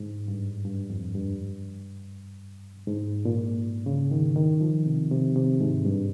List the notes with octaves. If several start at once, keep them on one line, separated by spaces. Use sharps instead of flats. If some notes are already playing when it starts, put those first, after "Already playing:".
Already playing: G#2
G2
G2
F2
G2
G#2
A#2
C#3
D#3
D#3
F3
C3
C3
C3
G#2
G2